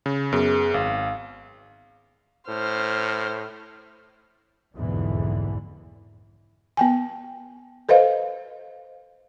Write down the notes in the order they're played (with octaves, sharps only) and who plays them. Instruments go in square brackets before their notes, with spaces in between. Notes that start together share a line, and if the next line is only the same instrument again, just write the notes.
[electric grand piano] C#3
[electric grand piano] F#2 [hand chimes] B3 G#4
[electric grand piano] G#1 [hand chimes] F5
[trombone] A2 [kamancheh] C5 F6
[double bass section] F1 B1 E2 G#2 D3 E3
[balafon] B3 G5 G#5
A4 B4 C5 D#5 F5